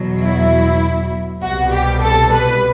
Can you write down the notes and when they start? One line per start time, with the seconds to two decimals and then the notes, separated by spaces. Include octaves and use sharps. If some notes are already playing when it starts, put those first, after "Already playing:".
Already playing: E2 B2 F#3
0.23 E4
1.42 C2 B2 G3 F#4
1.72 G4
2.02 A4
2.32 B4